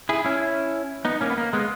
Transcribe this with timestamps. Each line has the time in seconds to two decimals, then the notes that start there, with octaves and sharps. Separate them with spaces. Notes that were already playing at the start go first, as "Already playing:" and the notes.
0.09 E4 G#4
0.25 C#4 E4
1.05 B3 D#4
1.21 A#3 C#4
1.30 B3
1.38 A#3
1.53 G#3 B3